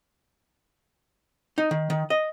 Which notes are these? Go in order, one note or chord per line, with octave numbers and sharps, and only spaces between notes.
D#4
D#3
D#3
D#5